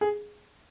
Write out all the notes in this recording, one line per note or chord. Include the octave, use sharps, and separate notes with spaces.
G#4